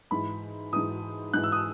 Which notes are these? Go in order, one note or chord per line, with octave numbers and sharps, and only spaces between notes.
G#2 E3 B5
G#2 E3 D#6
G#2 E3 F#6
E6
D#6